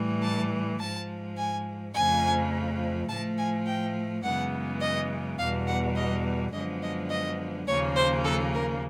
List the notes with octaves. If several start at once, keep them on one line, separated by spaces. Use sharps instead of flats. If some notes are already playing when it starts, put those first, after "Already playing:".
Already playing: A2 E3 G3
A5
G#2 F3 G#3 A5
G#5
F2 C#3 F3 A3 G#5
A2 F3 A3 A5
G#5
G5
F#2 C#3 E3 G#3 B3 F#5
D#5
E2 B2 G3 F5
F#5
D#5
F#2 D3 F3 G#3 B3 D#5
D#5
D#5
D#2 C#3 F3 A#3 C#5
C5
A4
A#4